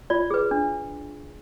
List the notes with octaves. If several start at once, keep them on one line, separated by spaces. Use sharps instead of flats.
F4 D5
G#4 B4
D4